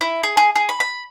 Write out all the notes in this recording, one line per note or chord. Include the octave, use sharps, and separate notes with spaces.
E4
G#4
G#4
G#4
B5
B5